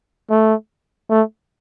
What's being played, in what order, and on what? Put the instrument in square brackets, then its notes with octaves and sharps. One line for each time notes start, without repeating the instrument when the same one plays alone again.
[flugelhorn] A3
A3